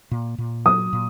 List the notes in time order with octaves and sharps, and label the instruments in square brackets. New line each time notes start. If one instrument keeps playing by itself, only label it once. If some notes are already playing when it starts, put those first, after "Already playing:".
[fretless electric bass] A#2
A#2
[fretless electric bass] F#3 [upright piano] D#6
[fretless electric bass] A#2